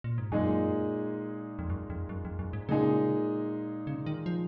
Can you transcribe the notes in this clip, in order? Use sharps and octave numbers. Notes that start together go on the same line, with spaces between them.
A#2
G#2
F#2 A#2 G#3 D#4 G#4
F2
F#2
F2
F#2
F2
F#2
G#2
A#2 C#3 G#3 D#4 G#4
C#3
D#3
F3